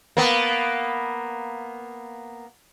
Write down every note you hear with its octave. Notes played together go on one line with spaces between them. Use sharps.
A#3 B3